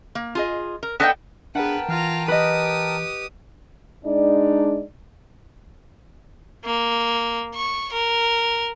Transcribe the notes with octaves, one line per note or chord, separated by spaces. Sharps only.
A#3
F4 G#4 D#5
A#4
B3 D4 D#4 A4 D5 G5
B3 D4 G#4 A#4 B4 F#5 G5 A5
E3 F4 A#5 F6
G4 B4 D#5 D#6
G#3 D4 D#4 D5
A#3
C#6
A#4